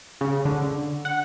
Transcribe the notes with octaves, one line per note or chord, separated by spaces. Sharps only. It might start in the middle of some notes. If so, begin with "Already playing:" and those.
C#3
D3
F#5